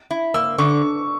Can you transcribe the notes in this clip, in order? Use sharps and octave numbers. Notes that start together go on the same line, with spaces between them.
E4
A#3 E6
D3 C#6